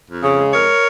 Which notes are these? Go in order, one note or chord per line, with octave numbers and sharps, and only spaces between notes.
F2
C#3
G#3
F2 A#4 C#5